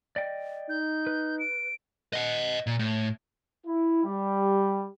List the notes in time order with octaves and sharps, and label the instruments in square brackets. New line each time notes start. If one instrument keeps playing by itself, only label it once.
[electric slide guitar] D5 D#5 G5
[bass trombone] D#4 [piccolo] G6
[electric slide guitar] B4
[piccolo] D7
[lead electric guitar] D#5 F#5
A#2
A2
[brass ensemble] E4
G3